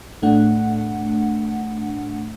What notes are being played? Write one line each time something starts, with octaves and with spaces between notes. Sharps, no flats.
A2 A3 D4 F#5